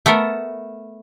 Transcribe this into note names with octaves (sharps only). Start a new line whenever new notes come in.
A3 B3 A4 A#4